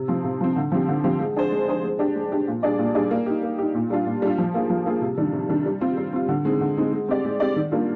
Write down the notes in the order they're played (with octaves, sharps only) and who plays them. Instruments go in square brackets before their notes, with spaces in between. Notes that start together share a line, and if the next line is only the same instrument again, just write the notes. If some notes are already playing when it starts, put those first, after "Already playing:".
Already playing: [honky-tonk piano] C3
F3 C4
C3
F3 C4
D3
F3 C4 G4
D3
F3 C4 G4
G#3
D4 G#4 C5
G#3
D4 G#4 C5
G#3
D4 G4
G#3
D4 G4
A#2
G3 D4 G#4 D5
A#2
G3 D4 G#4 D5
A#3
D#4 G4
A#3
D#4 G4
A#2
G3 D4 F4
A#2
G3 D4 F4
F3
A#3 F4 G#4
F3
A#3 F4 G#4
C3
D#3 G3 D4
C3
D#3 G3 D4
G3
C4 F4
G3
C4 F4
D3
G#3 C4 D#4
D3
G#3 C4 D#4
G#3
C4 G4 D5
G#3
C4 G4 D5
D#3
G3 A#3 D4 F4